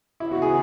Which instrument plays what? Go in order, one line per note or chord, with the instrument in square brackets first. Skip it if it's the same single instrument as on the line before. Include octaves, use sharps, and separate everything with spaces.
[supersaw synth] C#3 E3 B3 [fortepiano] E4
[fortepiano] F#4
G#4